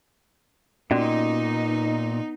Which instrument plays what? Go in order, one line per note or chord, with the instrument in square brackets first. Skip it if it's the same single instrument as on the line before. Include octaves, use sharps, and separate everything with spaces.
[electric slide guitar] A#2 [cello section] B3 D#4 [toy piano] C#4 F#4 D5